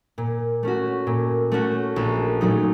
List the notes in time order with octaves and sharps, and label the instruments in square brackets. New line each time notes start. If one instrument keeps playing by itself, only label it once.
[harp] A#2
A3 C#4 F#4
A#2
A3 C#4 F#4
A#1
A#2 F#3 A3 D#4